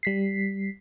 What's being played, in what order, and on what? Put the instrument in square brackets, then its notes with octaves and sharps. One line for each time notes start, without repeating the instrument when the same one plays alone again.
[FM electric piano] G3 B6 C7